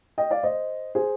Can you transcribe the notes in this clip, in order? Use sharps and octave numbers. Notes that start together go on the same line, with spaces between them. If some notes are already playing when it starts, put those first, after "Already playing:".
D#5 G5
D5 F5
C5 D#5
G#4 C5